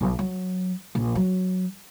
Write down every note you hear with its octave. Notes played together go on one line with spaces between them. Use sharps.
B1
F#3
A#1
F#3